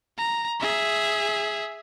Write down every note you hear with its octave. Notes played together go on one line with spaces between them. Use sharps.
A#5
G#4 E5